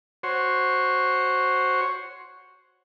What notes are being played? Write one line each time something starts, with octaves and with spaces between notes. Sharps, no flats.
F#4 C5 C#5